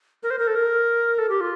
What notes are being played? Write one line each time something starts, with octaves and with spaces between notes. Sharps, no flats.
A#4
C5
A#4
A4
A#4
A4
G4
F4